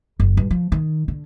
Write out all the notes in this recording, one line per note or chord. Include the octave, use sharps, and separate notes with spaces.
F#1
G2
F3
D#3
D3